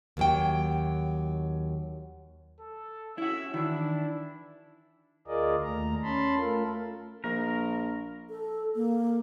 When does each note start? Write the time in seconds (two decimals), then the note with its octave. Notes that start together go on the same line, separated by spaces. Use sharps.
0.17 D#2 F#3 G5
2.60 A4
3.18 C#4 E4 F#4 E5
3.54 D#3 E3 D4 E4
5.27 D2 F4 G#4 A#4 D5 D#5
5.62 D#2 A3 A#5
6.03 C#4 A5 B5 C6
6.37 A3 F4 A4 A#4
7.24 A#1 A#4
8.29 A4
8.76 A#3